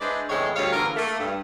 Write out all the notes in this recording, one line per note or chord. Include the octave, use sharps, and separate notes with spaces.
G#3 D4 E4 B4 C5 D5
E2 A2 C#3 G#3 C4 C#5
D2 G3 C#4 C#5 F5
E2 D3 F4 A#4
A3 A#3
G2